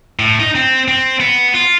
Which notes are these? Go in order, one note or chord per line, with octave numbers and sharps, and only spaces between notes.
A2
D#4
C4
C4
B3
F4